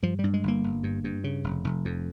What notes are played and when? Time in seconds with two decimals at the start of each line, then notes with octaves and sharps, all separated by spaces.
0.03 G2 F3
0.19 G2 G3
0.34 G#3
0.43 G1 A#3
0.64 G1
0.83 G2
1.04 G2
1.24 C#3
1.44 F1
1.64 F1
1.85 F2